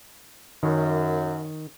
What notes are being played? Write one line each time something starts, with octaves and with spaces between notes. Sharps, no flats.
F#2 D#3